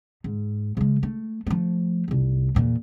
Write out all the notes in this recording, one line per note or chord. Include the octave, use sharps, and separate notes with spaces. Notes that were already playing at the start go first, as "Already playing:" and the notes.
G#2
C#3 G#3
A3
F3 A3
F1 C2
E2 A#2